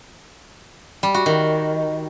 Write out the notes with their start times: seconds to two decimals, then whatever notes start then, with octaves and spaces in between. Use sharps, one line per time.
1.03 G3
1.14 F#4
1.26 D#3